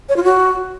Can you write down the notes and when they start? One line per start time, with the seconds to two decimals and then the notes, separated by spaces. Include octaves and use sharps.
0.09 C#5
0.16 F4
0.24 F#4